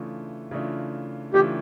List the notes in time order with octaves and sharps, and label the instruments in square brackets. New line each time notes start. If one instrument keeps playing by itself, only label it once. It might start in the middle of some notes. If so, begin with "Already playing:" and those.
Already playing: [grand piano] C#3 E3 A3 D4 F4
C#3 E3 A3 D4 F4
[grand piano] C#3 E3 A3 D4 F4 [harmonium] G4